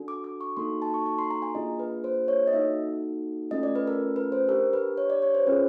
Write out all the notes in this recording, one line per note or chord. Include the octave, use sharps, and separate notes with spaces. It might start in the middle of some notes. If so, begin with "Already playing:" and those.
Already playing: D4 F#4 A4
D6
D6
C#6
A#3 D#4 F#4 A4 C6
A5
C#6
C#6
C6
A#5
G#5
A#3 D4 F4 G#4 D#5
B4
C5
C#5
D#5
A#3 D#4 F#4 A4 E5
A3 C#4 F4 A4 D#5
D5
B4
A#4
B4
C5
D4 G4 A#4
B4
C#5
D5
C#5
C5
C#4 F4 G#4 B4